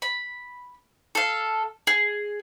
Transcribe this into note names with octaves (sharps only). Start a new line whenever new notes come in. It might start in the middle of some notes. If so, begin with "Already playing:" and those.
B5
A4 F5
G#4